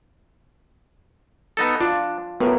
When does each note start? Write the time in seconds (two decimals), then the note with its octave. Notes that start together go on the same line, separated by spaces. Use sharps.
1.57 B3 D#4 A4
1.81 D4 F4
2.40 A2 B3 F#4 A#4